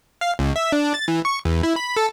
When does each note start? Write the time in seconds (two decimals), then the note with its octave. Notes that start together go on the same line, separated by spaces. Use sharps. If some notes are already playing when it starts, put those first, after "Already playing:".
0.21 F5
0.39 C#2
0.56 E5
0.72 D4
0.94 A6
1.08 E3
1.25 C#6
1.45 E2
1.63 E4
1.76 B5
1.96 A4